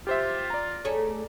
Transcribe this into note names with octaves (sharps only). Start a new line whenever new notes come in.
F4 G4 C5 E5
D5 A#5
A3 G#4 C#5